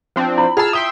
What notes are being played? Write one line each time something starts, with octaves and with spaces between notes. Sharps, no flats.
F3 C4 D4 C5
E4 B5
F4 G#4 D#5 F#5 A5 E6 F6
E5 G5 C6 D#6